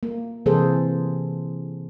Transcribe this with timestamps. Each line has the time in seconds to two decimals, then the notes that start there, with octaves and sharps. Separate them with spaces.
0.03 A#3
0.46 C3 E3 A#3 G#4 A4 C5